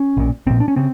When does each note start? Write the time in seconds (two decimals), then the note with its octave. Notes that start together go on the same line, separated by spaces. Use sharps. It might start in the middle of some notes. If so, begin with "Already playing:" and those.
Already playing: C#4
0.17 A#1 A#2
0.47 A#1 A#2 C4
0.60 D4
0.68 C#4
0.76 C#3 C4